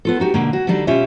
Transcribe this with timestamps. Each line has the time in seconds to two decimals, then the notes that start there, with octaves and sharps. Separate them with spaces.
0.05 B3 F4 A4
0.20 D#4 F#4 G4
0.34 B2 D3 A#3
0.53 F#4
0.67 D3 F#3 G3 D4 D#4 A4
0.87 B2 C#4 F4 G4 E5